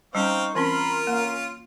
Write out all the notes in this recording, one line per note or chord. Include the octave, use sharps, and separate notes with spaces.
G3 C4 C#4 D#4 F5 C#6
E3 C4 C#4 F4 A#4 B5 C6
A#3 C#4 F5